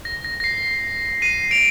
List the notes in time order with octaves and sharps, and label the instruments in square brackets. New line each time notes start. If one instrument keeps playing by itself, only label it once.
[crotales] A#6
A#6
A#6
C7
C7 D#7
D7 F7